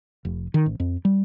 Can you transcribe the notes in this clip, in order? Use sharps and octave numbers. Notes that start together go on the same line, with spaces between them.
F1
D#3
A1
F2
G3